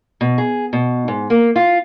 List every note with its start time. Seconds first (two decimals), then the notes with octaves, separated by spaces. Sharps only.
0.21 B2
0.38 G#4
0.73 B2
1.08 G#2
1.30 A#3
1.56 F4